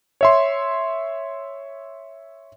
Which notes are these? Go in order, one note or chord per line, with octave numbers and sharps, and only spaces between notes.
C#5 E5 C6